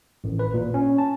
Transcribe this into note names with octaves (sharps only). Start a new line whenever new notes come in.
A1
B4
A#2
C#4
A5